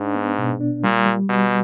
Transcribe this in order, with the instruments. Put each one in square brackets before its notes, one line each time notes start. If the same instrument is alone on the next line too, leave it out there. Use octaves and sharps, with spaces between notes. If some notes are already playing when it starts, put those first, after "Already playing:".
Already playing: [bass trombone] G#2 [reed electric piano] D4
[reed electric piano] B3
B2
D4
[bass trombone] A#2 [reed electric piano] G3
[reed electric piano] G3
[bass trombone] B2 [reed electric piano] G3